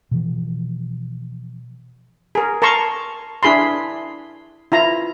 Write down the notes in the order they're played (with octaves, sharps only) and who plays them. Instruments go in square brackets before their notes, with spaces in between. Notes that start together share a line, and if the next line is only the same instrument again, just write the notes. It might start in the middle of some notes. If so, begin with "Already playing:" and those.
[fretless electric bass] B2 E3 F3
[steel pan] G#4 A#4
A#4 A5 A#5 C6 C#6
D4 E4 G#4 B5 C6
E4 F4 A#5